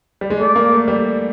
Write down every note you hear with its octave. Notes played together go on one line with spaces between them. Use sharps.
G3
G#3
A3 D5
A#3
A3
G3